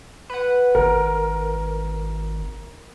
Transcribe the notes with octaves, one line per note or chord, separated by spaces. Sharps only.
B4 F#5
G#1 A#4